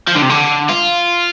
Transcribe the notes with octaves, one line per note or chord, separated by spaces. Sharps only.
F3
D3
C3
D3
F4